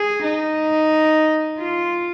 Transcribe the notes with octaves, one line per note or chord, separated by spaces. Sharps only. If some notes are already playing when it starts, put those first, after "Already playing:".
Already playing: G#4
D#4
F4